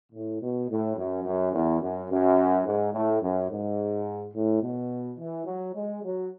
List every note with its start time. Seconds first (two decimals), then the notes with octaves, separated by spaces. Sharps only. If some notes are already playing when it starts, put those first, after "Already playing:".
0.13 A2
0.40 B2
0.69 A2
0.96 F#2
1.24 F#2
1.53 E2
1.81 F#2
2.10 F#2
2.66 G#2
2.93 A2
3.21 F#2
3.49 G#2
4.34 A2
4.62 B2
5.18 E3
5.45 F#3
5.74 G#3
6.02 F#3